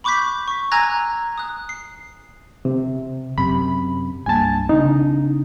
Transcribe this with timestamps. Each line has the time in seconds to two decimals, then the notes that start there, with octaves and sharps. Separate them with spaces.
0.04 B5 C#6 D6 F#6 G6 B6
0.48 C#6 B6
0.71 G#5 A#5 E6 F#6 G#6 A#6
1.38 D#6 F#6
1.69 C7
2.65 C3
3.38 F#2 C3 B5
4.26 C2 G2 A#3 G#5 A5
4.69 C#3 C4 D4 D#4